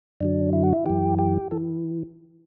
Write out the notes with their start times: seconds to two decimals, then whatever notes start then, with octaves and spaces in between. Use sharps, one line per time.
0.20 F#2 D3 F#3 D4
0.53 E4
0.63 F#4
0.73 E4
0.86 F#2 E3 G4
1.19 G4
1.51 E3 A4